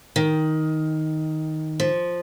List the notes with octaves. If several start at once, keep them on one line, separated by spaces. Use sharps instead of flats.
D#3
F3